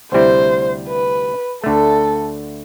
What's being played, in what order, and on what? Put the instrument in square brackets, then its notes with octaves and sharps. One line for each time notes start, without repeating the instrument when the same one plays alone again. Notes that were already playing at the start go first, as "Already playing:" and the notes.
[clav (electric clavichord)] D2 C3 G3 C4 E4 [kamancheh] C5
[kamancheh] B4
[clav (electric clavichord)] D2 D3 A3 [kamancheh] A4